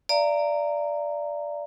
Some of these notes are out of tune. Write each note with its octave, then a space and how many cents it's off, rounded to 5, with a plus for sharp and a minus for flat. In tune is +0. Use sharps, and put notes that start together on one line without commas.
D5 +0 F5 -45 A#5 -15